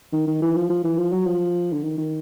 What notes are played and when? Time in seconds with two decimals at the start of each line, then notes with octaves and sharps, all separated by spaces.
0.13 D#3
0.27 D#3
0.42 E3
0.56 F3
0.70 F3
0.84 E3
0.97 F3
1.12 F#3
1.26 F3
1.72 D3
1.83 D#3
1.98 D#3